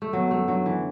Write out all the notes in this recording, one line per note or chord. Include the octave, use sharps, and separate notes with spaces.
A3
F#3 B3
F#2 A3
F#3 D4
D3 E3